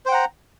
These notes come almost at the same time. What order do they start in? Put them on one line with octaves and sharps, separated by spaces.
C5 G5 F#5 A#5